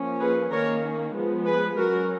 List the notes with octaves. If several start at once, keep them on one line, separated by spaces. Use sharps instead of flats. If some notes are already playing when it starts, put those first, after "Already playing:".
Already playing: F3 A#3 C#4
G#4 B4
D#3 A#3 C#4 A#4 C#5
F3 G#3 B3
G#4 B4
F#3 C#4 F#4 A#4